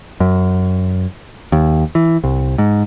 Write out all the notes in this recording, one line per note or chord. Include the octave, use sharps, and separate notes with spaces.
F#2
D#2
E3
C2
G#2